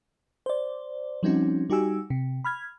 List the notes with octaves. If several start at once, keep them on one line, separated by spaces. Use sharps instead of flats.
C5 D5
F3 G3 C4 C#4 D#4 F#4
G3 D#4 F#4 G4 G#5 E6
C3
B5 F6 G#6